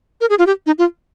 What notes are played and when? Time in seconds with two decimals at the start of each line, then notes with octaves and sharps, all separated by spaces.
0.21 A#4
0.30 G#4
0.39 F4
0.47 G4
0.66 D#4
0.78 F4